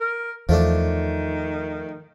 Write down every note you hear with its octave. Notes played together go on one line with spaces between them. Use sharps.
A#4
E2 D#3 F3 A3 D4